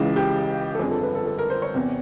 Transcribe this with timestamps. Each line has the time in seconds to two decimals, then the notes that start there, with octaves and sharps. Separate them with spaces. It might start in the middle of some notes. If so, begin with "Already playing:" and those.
Already playing: C#2 C#3 E3
0.16 G4
0.75 A4
0.79 G1 F2 D3 G#4
0.91 A4
1.03 B4
1.15 A4
1.27 A4
1.38 A#4
1.50 C5
1.62 C#5
1.74 E2 C3